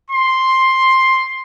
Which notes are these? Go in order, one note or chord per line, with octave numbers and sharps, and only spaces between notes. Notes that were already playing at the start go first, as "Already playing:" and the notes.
C6